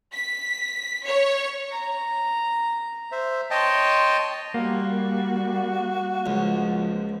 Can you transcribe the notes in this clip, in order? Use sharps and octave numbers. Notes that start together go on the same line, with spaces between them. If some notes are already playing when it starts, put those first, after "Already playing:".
B6
C#5
A#5
C5 E5
C#5 D#5 G5 A5 C6
G3 A#3 F#4
C#2 F3